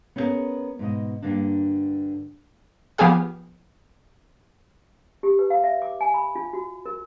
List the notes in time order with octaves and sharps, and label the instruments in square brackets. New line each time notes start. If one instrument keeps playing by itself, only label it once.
[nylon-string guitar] B3 C#4 E4 F4 G#4 A#4
G#2 B2 D#5
G2 D3 A#3 D4
[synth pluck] F3 B3 G4 G#4 F5
[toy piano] G4
B4
F5
E5
D6
G#5
B5
F4
F#4
A#4